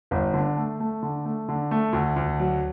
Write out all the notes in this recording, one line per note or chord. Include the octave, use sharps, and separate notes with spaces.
G1
D3
A3
A3
D3
A3
D3
A3
D2
D2
F#3